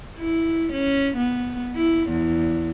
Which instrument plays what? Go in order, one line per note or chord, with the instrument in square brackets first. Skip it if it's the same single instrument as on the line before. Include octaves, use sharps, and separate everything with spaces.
[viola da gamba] E4
C#4
B3
E4
E2